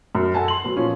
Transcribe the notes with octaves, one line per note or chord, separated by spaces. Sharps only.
F#2
A4 F#5 G#5 A5
C6 F#7
F#3 B3
A#2 F3 C#4